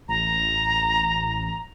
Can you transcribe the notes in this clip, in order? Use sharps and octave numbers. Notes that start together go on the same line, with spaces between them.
A1 A#5